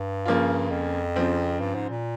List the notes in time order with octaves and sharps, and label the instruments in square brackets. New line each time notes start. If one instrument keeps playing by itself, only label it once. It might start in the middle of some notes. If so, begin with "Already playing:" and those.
Already playing: [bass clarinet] G2
[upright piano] C#3 F3 A#3 F4
[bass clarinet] F2
[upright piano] C#3 F3 C4
[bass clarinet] G2
G#2
A#2